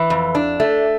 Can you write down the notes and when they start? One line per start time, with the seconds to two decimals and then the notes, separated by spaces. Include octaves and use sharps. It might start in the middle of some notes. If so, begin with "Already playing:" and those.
Already playing: E3
0.10 F2
0.35 D4
0.60 A3